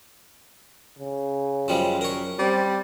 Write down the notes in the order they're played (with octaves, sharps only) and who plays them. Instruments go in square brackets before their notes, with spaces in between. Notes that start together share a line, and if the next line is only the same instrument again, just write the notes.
[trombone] C#3
[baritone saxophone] F#2 [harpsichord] F3 G3 G#3
[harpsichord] A#4 C#5
[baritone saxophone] G3 [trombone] C4